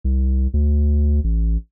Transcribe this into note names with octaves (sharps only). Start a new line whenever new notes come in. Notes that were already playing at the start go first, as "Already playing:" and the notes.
C2
D2
A1